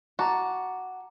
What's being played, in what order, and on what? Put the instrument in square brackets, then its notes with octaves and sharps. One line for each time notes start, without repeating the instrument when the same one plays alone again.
[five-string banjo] F#4 [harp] A5 A#5 D6